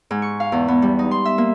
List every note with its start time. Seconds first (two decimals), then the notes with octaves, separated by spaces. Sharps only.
0.11 G#2
0.22 C#6
0.40 F5
0.52 E2
0.68 B3
0.82 G3
0.99 D#4
1.11 C6
1.25 E5
1.38 A#3